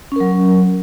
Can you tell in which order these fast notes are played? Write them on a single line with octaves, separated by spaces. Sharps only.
C#4 A#4 F#3